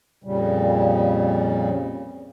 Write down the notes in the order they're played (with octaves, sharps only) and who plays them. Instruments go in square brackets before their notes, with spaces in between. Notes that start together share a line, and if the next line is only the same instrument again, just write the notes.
[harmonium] F2 A#2 C#3 G3